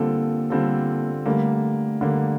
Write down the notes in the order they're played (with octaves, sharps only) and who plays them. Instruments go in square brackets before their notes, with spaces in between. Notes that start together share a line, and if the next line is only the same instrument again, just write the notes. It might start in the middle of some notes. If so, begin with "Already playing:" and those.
Already playing: [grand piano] D3 G3 C4 F4 A4 [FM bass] A#3
[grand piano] D3 G3 C4 F4 A4
[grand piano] D3 G3 A#3 [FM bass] A3
[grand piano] D3 G3 A#3